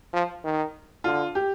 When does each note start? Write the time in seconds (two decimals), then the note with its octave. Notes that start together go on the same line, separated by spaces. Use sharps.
0.14 F3
0.44 D#3
1.04 D3 F4
1.35 G4